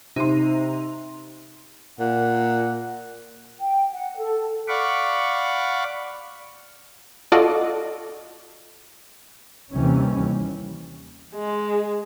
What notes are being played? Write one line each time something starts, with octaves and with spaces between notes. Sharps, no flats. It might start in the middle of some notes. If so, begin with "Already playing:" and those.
C3 D#4 C6
A#2 F#5
G5
F#5
A4
D5 F5 F#5 B5 C#6 D6
F4 F#4 A4 D5 D#5
D#2 C3 E3 G3 C#4
G#3